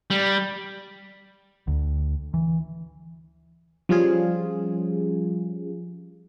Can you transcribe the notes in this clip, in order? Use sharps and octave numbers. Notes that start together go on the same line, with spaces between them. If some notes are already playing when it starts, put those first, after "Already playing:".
G3
D2
E3
F3 G3 C#4 F4 G#4